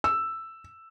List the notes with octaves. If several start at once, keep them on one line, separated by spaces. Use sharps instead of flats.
E6